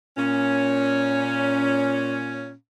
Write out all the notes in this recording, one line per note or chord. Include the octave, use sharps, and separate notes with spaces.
A#2 C#4